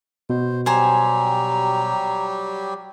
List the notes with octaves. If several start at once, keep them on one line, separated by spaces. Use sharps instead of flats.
B2 C5
F#3 G3 G4 C5 G#5 A#5